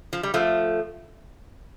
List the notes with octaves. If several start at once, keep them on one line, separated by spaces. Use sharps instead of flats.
F3
G3
F3 A3